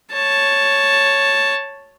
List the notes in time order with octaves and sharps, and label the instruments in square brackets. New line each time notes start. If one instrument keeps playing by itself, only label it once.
[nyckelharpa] C#5 A5